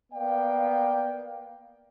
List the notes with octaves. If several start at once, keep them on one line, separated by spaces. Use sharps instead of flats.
A#3 B3 D5 F5 G5